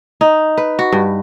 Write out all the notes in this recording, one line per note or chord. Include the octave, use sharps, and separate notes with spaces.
D#4
B4
F#4
G2